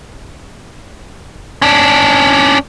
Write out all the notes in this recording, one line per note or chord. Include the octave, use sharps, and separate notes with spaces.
C#4 D4